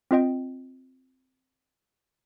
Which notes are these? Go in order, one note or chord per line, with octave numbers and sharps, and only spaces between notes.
C4 F4 D#5 G5